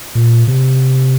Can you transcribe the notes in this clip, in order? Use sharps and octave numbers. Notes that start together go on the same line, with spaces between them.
A#2
C3